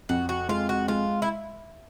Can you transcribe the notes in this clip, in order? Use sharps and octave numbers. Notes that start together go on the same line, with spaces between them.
F2 F#4
F#4
G#3 F4
F#4
G#3 F4
E4